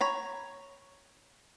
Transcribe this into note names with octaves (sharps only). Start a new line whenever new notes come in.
C#5 A#5 B5